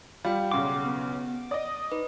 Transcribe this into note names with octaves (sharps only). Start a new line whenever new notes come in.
G3 F4 F5 G5
B1 C#3 F#5 C6 D6
B3
D5 D#5 D#6
D#4 B4